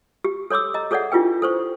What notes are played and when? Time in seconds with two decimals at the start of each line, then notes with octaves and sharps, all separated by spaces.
0.24 G4
0.51 A4 C#5 C6 D6 E6
0.74 D#5 A#5
0.91 G#4 A4 C#5 D5 E5 F#5
1.12 D4 E4 F4 G4 B4 G5
1.42 A4 C5 C#6